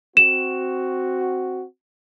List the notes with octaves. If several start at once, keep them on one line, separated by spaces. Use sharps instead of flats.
C4 F#4 E7